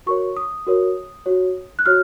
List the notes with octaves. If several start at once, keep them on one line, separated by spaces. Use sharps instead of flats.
F#4 A#4 C#5 C#6
D#6
F#4 A#4 C#5
F#4 C#5
F#6
F#4 C#5 F6